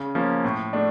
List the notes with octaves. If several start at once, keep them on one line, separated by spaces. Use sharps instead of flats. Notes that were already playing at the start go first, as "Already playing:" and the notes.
Already playing: C#3
F3 A#3 C#4
A2
A3 D4